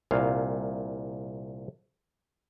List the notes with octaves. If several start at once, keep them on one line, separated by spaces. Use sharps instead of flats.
C2 A#2 F5